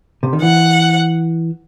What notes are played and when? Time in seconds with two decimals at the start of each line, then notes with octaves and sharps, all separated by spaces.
0.23 C3
0.33 D#3
0.42 E3 F#5